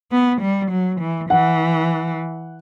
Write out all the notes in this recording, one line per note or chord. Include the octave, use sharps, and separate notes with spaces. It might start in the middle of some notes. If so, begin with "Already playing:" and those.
B3
G3
F#3
E3
E3 F#5